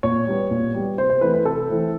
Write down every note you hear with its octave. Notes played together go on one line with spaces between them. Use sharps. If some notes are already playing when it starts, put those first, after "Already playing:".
A#2 C#5
G3 B3
A#2
G3 B3
C3 C5
C5
E3 A3 C4 B4
B4
C3 A4
E3 A3 C4